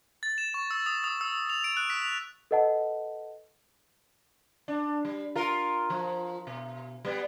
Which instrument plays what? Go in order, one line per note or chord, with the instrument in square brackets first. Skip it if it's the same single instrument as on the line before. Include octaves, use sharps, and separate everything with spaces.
[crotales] A6
E7
C#6
E6
D#6
D#6
E6
F7
D7
F#6
B6
F7
[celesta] A4 B4 D#5 F#5 A5
[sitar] D4
G3
F4 A#4
F3
B2
G3 B3